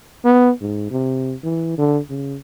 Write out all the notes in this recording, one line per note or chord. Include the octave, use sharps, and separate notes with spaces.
B3
G#2
C3
E3
D3
C#3